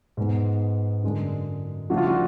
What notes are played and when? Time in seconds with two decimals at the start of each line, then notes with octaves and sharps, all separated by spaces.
0.17 G#2 G#3 B3
1.03 F#2 D3 G#3
1.90 C#3 F3 A3 D4 F#4
1.97 F4
2.06 F#4